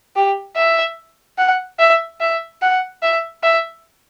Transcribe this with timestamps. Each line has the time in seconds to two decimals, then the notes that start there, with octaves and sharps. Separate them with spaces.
0.16 G4
0.56 E5
1.38 F#5
1.79 E5
2.20 E5
2.62 F#5
3.02 E5
3.43 E5